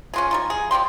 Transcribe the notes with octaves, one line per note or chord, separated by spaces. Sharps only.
C#4 F4 G#4
G3 D#4 F4
G#4
F3 G3 G5 C6